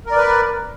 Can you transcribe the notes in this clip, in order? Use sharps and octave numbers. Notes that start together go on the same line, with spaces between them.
A#4 B4 D5